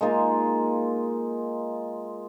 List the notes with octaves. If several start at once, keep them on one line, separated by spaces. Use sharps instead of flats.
G#3 A#3 D#4 F4